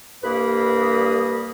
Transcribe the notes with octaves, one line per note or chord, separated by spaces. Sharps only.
C2 G2 A#3 B4 B5 D#6